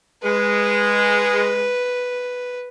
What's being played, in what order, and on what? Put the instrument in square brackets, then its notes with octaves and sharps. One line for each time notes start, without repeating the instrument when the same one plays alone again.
[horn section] G#3 [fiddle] B4